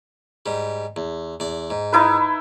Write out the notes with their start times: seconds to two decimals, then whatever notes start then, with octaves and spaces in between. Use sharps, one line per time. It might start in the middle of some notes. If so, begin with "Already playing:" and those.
0.46 G#2 G3
0.96 E2
1.40 E2 D5
1.70 G#2
1.93 D#4 E4 B4